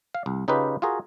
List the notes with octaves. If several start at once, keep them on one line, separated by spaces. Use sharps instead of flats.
F5
C2
C#3 D#4 F4 G4 B4
F4 F#4 G#4 A#4